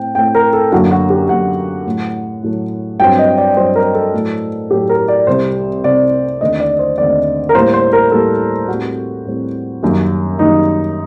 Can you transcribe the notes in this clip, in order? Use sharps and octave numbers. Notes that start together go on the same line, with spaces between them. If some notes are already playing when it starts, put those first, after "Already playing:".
Already playing: A2 A3 C4 G5
A2 A3 C4 G5
A#4
A4
F#2 D3 F#3 A#3 F#4
F#4
G4
F#2 D3 F#3 A#3 F#5
A2 F#3 A3
A2 F#3 A3
G2 F#3 C4 G5
D#5
D5
G2 F#3 C4 C5
A#4
A4
A2 F#3 A3
A2 F#3 A3 G4
A#4
D5
C2 C3 G3 C4 C5
C2 C3 G3 C4 D5
D#2 D3 A3 C4 D#5
D5
C5
D#2 D3 A3 C4 D5
A#4
A2 G3 A#3 C5
C5
A#4
A2 G3 A#3 A4
A2 G3 C4 F#4
A2 G3 C4
F#2 D#3 G3 A#3
F#2 D#3 G3 A#3 D#4